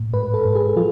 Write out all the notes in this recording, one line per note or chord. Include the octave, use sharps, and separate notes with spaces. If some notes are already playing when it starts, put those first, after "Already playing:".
Already playing: A2
G#2 B4
A4
G#2
G#4
F3 F4